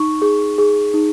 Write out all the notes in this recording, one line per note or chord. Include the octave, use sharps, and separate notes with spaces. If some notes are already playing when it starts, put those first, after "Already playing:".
Already playing: D#4 C#6
G#4
G#4
D#4